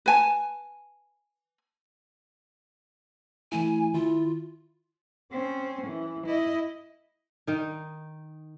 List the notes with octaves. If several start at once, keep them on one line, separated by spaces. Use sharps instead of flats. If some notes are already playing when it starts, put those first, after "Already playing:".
B4 G#5 A5
E3 A3 E4 G#5
D#3 E4 F4
C4 C#4
E3
E4 D#5
D#3 D#4